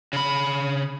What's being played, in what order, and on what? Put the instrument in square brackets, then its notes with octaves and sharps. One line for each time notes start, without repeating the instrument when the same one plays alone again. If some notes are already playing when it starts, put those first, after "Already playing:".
[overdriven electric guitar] C#3 B5